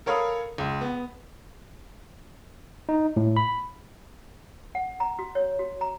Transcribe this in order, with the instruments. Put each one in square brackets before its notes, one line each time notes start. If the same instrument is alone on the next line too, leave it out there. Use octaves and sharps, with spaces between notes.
[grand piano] A4 A#4 C#5 F5 B5 D#6
C#2
B3
[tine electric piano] D#4
A2
B5
[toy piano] F#5
A#5
F#4
C#5
F#4
A#5